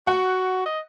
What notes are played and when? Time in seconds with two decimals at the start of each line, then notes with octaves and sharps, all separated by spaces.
0.07 F#4 F#5
0.66 D#5